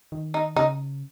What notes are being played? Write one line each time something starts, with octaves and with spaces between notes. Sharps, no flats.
D#3
D#4
C#3 D#4